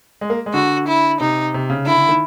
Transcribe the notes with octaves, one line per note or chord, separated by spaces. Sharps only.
G#3
A#3
G#3
D3 F#4
E4
C3 D#4
C3
C#3
D3 E4
D3
D#3